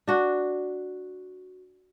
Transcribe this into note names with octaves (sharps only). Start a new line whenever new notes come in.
D4 F#4